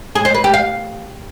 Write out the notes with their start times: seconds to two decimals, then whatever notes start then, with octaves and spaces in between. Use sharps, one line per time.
0.15 G#4
0.25 C5
0.34 B4
0.44 G4
0.54 F5